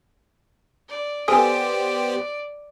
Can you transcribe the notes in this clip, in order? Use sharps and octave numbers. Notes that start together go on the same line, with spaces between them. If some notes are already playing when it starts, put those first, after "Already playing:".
D5
B3 G4 A4 C5 D5 G#5 D#6